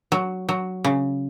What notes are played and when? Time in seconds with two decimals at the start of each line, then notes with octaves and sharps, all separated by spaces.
0.12 F#3
0.49 F#3
0.84 C#3